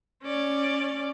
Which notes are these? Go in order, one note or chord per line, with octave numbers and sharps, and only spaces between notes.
C#4 D5